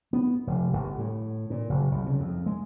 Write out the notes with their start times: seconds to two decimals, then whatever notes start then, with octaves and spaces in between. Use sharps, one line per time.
0.13 B3
0.47 F1
0.73 G1
0.99 A2
1.50 A#2
1.69 F#1
1.92 C2
2.06 C#3
2.20 F2
2.46 G#3